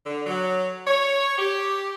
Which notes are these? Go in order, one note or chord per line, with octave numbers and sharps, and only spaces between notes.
D3
F#3
C#5
G4